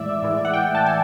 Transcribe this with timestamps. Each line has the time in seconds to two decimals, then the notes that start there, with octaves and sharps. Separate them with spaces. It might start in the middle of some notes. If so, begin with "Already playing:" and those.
Already playing: A2 E3 G#3 D5 E5
0.22 A2 E3 G#3
0.45 F#5
0.53 G5
0.75 A5
0.86 G#5